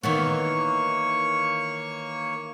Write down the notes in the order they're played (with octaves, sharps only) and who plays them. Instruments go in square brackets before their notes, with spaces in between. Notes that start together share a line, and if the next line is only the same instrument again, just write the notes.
[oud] D#3 E3 B3 [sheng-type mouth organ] A#3 C#5 C#6